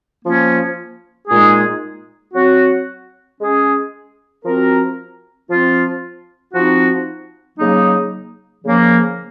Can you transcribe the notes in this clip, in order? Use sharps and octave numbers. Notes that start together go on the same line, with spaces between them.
F3 A#3 C#4
A#2 G#3 D#4 G#4
F#3 C4 F#4
G#3 C#4 G#4
F3 C4 F#4 A#4
F3 C4 F4
F3 C4 D#4 F#4
C#3 F#3 A#3 D#4
C#3 F3 A#3 C#4